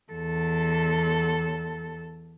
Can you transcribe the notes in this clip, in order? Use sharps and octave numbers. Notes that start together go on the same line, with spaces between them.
E2 A4